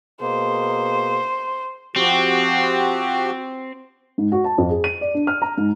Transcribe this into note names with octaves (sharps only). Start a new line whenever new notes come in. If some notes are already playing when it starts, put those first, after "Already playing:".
B2 A#3 G#4 C5
F3 C4 F#4 G4
G#2
F#4
A5
F2
G#4
D#7
D5
D4
F6
A#5
G#2